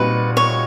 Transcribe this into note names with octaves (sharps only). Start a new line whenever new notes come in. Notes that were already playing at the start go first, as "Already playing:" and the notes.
Already playing: A#2 G3 C4 D#4 F#4 B4
C#5